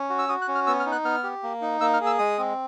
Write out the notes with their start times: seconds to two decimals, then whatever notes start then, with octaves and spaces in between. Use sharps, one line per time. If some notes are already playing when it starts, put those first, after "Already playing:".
Already playing: C#4
0.10 F#4
0.18 E6
0.29 F#4 D#6
0.42 F#6
0.48 C#4
0.55 F6
0.67 B3 E6
0.80 F6
0.86 D#4
0.92 F#6
1.05 B3 F6
1.23 G4
1.43 A#3
1.61 D#4
1.81 A#3 E6
1.94 F6
2.01 G#4
2.06 E6
2.19 G#3 D#6
2.38 C4